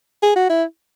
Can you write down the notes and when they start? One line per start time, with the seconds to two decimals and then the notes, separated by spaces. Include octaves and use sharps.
0.23 G#4
0.36 F#4
0.50 E4